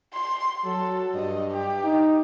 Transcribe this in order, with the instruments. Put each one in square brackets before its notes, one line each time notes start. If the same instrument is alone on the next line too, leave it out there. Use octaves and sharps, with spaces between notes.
[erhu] C6
[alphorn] F#3 [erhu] A4
[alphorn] G2 [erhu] D#5
[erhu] G4
[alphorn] D#4